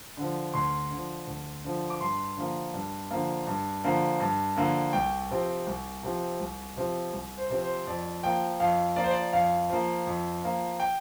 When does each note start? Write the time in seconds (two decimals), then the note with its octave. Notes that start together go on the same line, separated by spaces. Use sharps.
0.17 D3 F3
0.54 D2 C6
0.91 D3 F3
1.27 D2
1.64 D3 F3
1.90 D6
2.01 G2 C6
2.37 D3 F3 A#3
2.74 G2
3.11 D3 F3 A#3
3.47 G2
3.84 D3 F3 A#3
4.20 G2
4.56 D3 F3 A#3
4.93 C2 G5
5.30 C3 F3 C4
5.67 C2
6.03 C3 F3 C4
6.40 C2
6.77 C3 F3 C4
7.13 C2
7.37 C5
7.50 C3 F3 C4
7.62 C5
7.87 F2 D5
8.23 F3 A#3 G5
8.60 F2 F5
8.96 F3 A#3 D5
9.04 C5
9.11 D5
9.33 F2 F5
9.69 F3 A#3
10.07 F2
10.44 F3 A#3
10.80 G5